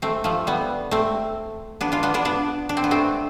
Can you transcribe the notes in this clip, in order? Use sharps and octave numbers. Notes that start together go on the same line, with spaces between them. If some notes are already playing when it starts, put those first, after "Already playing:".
A3 C4
F3 A3
G3 B3
A3 C4
B3 D4
D4 F4
B3 D4
B3 D4
B3 D4
D4
C4
B3
A3 C4